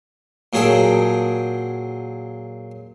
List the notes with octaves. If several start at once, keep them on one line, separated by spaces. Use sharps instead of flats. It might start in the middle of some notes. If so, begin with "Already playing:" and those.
A#2 F#3 G#4 A4 G5